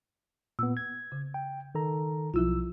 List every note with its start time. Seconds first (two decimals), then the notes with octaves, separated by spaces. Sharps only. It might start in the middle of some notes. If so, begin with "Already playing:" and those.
0.59 A#2 B3 E6
0.77 G#6
1.12 C#3
1.34 G5
1.75 D#3 A4 A#5
2.34 B1 F3 E4 F4 E6